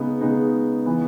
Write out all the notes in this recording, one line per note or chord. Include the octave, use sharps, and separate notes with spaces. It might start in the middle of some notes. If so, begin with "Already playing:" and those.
Already playing: C#3 G#3 B3 D#4
C#3 G#3 B3 D#4
C#3 E3 B3